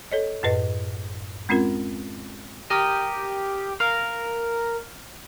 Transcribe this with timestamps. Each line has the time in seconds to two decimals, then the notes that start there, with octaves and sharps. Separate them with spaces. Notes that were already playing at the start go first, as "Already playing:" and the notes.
0.12 A4 C#5 D#5
0.43 F#2 A2 B4 D#5
1.49 G#3 C4 C#4 F4 A#4
2.70 G4 A#4 D#5
3.80 A#4 F5